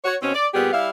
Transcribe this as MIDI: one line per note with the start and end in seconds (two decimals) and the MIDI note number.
0.05 0.16 66
0.05 0.16 73
0.22 0.33 47
0.22 0.33 60
0.22 0.33 61
0.34 0.47 74
0.54 0.69 46
0.54 0.69 55
0.54 0.69 59
0.54 0.69 67
0.54 0.69 68
0.73 0.90 55
0.73 0.90 64
0.73 0.90 77